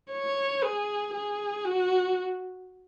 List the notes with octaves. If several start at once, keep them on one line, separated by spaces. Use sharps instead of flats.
C#5
G#4
G#4
F#4